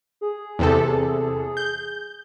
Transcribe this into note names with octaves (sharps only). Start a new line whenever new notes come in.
G#4
E2 C3 A4
G6